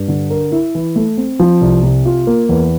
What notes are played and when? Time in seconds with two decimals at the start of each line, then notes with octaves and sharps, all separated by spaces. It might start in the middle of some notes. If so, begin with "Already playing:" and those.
Already playing: G2
0.08 D3
0.30 A#4
0.52 E4
0.75 E3
0.96 A3
1.17 C4
1.40 F3
1.61 C2
1.83 C3
2.06 F4
2.27 A#3
2.49 E2